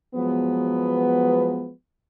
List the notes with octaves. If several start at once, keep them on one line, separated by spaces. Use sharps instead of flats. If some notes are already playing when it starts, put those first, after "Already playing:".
F3 F#3 G#3 B3